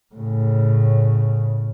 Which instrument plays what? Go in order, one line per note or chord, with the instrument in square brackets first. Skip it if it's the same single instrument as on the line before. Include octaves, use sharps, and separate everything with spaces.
[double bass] A2 C#3